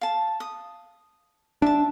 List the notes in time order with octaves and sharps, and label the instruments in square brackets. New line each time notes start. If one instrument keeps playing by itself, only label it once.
[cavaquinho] F5 A5
D#6
[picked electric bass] D4 [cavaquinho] E5 A5